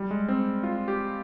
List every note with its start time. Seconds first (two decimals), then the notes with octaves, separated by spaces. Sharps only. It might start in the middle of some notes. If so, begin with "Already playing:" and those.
Already playing: G3
0.11 G#3
0.28 C4
0.63 F4
0.88 G4